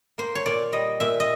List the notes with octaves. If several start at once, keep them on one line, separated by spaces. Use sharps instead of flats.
A#3 C5
C#5
A#2 D5
G3 D#5
A#2 E5
D#5